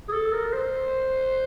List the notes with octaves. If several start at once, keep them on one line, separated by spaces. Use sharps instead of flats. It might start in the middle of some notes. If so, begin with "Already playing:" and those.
G#4
A4
A#4
C5